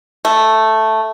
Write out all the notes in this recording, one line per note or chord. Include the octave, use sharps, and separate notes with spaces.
A3